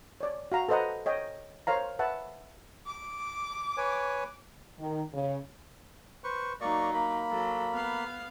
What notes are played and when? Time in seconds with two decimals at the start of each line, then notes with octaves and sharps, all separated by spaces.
0.21 C#5 D5
0.52 F#4 F5 A#5
0.69 A4 B4 C5 D#5 F#5 A#5
1.06 C#5 D#5 G5
1.67 A#4 C5 C#5 F5 A#5
1.99 B4 E5 F#5 A5
2.86 D6
3.77 B4 C#5 G#5
4.79 D#3
5.13 C#3
6.24 B4 C5 C#6
6.61 F#3 A#3 D#4 D5 C#6
6.94 A#3 B5
7.30 F#3 A4
7.72 B3 F5